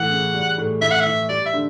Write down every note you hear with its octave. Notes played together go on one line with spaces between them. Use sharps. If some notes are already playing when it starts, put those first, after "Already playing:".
Already playing: A2 E3 F#5
C#3
G3
A2
E3 E5
F#5
E5
E3
G3 D5
E5
D3